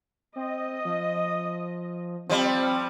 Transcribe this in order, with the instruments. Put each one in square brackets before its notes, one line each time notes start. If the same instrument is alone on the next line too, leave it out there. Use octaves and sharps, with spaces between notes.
[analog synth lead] C4 [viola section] D#5
[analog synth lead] F3
[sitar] F3 G3 [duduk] C4